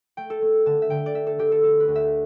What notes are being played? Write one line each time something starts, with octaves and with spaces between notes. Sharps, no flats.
A3 G5
A4
A3
D3 A5
E5
D3 G5
D5
D4 E5
A4
D3 G4
A4
A3 A4
B4
D2
E5